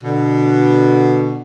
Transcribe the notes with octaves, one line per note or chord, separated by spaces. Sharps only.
B2 D3